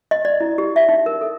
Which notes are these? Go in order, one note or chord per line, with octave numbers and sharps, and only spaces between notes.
D#5
D5
E4
G4
E5
D#4
A#4
A4